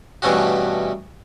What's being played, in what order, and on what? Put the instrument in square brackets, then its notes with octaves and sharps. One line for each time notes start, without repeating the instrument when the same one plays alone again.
[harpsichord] G2 B2 E3 A3 C#4 F#4